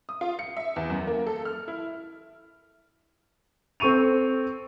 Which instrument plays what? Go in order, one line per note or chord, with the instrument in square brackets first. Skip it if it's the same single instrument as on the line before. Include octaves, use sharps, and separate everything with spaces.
[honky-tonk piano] D#6
F4
C#7
E5
E2
F#2
A#3
A4
F6
E4
[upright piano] C4 A4 C#6 D#7 F7